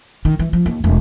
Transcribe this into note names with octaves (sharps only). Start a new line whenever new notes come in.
D#3
E3
F3
D#2
E1